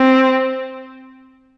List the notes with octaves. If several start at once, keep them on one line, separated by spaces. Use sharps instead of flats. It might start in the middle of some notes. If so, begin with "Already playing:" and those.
Already playing: C4